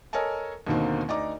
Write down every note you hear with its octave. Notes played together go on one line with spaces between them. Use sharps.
A4 A#4 C#5 D#5 G#5 A5
D#2 B2 D3 D#3 A#3 C4
D2 D#4 D5 A#5 D6